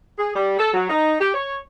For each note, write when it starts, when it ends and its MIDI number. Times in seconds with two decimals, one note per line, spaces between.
0.19 0.34 68
0.36 0.57 55
0.59 0.71 69
0.74 0.86 54
0.90 1.16 63
1.21 1.31 67
1.34 1.58 73